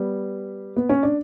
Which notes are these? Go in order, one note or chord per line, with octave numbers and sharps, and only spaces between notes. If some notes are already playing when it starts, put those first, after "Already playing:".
Already playing: G3 B3
B3
C#4
D4